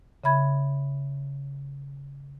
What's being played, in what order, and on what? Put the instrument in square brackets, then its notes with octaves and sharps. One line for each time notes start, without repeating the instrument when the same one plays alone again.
[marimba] C#3 E5 B5 G#6